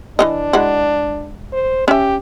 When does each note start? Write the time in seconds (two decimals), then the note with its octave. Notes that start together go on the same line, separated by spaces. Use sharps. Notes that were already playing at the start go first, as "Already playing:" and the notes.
0.19 E3 B3 D4 D#5
0.53 G#3 E4 F#4
1.53 C5
1.88 C#4 G4 E5